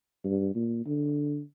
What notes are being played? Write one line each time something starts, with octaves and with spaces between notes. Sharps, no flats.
G2
A#2
D3